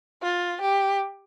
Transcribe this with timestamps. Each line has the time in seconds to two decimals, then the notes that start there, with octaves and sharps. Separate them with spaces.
0.23 F4
0.61 G4